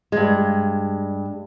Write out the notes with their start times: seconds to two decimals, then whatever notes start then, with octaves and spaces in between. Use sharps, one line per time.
0.12 G2 G#3